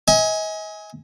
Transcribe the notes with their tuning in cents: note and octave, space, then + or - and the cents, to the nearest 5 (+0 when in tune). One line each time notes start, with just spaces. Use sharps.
D#5 +40 G#5 +0